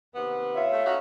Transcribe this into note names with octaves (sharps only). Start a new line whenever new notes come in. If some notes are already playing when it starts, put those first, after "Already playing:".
D#2 C3 B3
F4 C#5 E5
A3
C#4 D#4 F#4